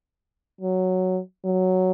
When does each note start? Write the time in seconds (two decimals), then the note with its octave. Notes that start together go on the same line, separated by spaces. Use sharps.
0.61 F#3
1.45 F#3